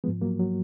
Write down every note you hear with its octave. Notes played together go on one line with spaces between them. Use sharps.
G#2 F3 G#3 B3
F#3 A#3
F#3